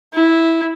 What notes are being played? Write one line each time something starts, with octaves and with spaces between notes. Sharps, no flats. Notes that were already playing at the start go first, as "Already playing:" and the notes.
E4